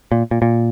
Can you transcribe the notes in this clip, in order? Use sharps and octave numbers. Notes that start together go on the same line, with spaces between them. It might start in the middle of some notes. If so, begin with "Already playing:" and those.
A#2
A#2
A#2